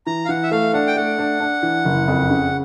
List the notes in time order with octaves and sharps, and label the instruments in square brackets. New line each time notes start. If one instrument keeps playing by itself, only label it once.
[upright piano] E3 [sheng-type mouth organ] A#5
[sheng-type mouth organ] F5
[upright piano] E3 [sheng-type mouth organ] F#5
[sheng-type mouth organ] E5
[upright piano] A3 [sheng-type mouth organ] F5
[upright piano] D4 [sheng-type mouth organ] F#5
[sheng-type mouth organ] G5
[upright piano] A3 [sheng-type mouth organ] F#5
[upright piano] D4
D4
E3
F#1
F2
C#3